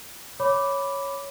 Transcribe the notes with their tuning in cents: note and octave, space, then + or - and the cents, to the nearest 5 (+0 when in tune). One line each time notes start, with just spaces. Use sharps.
C#5 +0 B5 +0 D6 -10